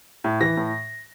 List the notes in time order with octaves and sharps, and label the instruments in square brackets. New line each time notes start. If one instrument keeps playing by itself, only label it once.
[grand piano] A2
E3 A#6
A2